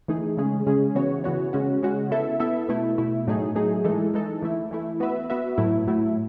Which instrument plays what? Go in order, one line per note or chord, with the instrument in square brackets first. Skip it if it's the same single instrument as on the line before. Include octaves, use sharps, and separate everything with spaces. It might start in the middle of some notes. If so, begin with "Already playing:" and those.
[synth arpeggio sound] E3 A3 D#4 G#4
C#3 G#3 C#4 G#4
C#3 G#3 C#4 G#4
C#3 E3 B3 F#4 C#5
C#3 E3 B3 F#4 C#5
C#3 G#3 C#4 F#4
C#3 G#3 C#4 F#4
B3 E4 A4 E5
B3 E4 A4 E5
B2 A3 E4
B2 A3 E4
A2 F#3 A3 D#4 G#4
A2 F#3 A3 D#4 G#4
E3 G#3 D#4 A4
E3 G#3 D#4 A4
E3 A3 E4
E3 A3 E4
B3 F#4 B4 E5
B3 F#4 B4 E5
A2 F#3 A3 E4
A2 F#3 A3 E4